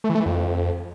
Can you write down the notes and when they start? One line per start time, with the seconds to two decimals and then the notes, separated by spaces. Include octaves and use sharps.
0.04 A3
0.10 E3
0.15 A3
0.20 E3
0.26 F2